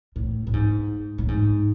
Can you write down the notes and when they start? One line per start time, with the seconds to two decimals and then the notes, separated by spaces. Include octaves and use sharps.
0.16 A2
0.47 A2
0.53 G#2
1.18 A2
1.28 G#2